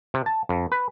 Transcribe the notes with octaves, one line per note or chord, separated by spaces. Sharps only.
C3
A5
F2
B4